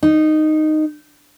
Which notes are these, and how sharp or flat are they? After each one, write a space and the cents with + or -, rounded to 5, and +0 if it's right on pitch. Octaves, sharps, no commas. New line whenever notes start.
D#4 -10